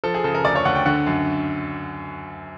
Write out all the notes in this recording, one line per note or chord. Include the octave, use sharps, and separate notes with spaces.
F3 A4
G#4
C#3 A4
A#4
D2 D5
C#5
D2 F#5
G5
D3 F#5
F#2